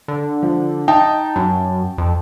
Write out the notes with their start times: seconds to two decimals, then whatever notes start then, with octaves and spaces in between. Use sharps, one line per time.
0.08 D3
0.43 F3
0.88 D#4 G5 A5
1.36 F#2
1.98 F2